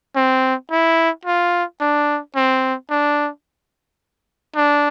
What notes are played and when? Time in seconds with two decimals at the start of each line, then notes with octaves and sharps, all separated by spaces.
0.16 C4
0.71 E4
1.25 F4
1.81 D4
2.36 C4
2.90 D4
4.56 D4